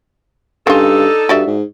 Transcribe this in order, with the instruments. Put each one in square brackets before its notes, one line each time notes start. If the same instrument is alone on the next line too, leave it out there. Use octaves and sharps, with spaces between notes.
[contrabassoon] G2 [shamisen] C#3 F4 [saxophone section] D4 D#4 A4
[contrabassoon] G2 [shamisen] F#4 D5 E5
[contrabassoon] G#2